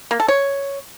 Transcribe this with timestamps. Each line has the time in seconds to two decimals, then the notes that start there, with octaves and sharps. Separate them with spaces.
0.11 A#3
0.20 A4
0.28 C#5